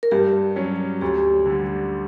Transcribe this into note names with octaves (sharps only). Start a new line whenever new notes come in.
A#4
G2 G4
F#3 C#4
D2 G4
D3 G3